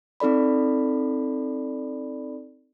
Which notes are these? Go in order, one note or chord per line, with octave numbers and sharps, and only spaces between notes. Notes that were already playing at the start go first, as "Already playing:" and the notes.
C4 D#4 A4 D5 B5